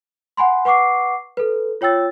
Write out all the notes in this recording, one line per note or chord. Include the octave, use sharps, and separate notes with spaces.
F#5 G#5 B5 C6
B4 F#5 C#6 D6 C7
A4 B4
F4 C#5 G5 E6 A6